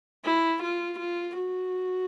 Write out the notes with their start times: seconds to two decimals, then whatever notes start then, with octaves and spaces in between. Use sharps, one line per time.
0.25 E4
0.63 F4
0.99 F4
1.37 F#4